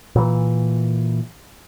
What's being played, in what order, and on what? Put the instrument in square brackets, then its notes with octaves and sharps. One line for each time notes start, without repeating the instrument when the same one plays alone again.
[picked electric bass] A#2 E3